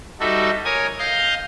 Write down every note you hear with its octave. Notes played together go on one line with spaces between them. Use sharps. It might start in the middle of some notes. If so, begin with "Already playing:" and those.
G3 D#4 F#4 A4 E5
A#4 C#5 G#5 D#6
D#5 F5 F6 G6